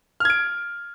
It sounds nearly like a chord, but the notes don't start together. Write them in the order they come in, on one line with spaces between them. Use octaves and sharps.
F6 G#6 D7